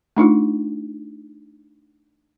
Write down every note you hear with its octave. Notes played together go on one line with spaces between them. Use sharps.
A3 D4 D#4 F4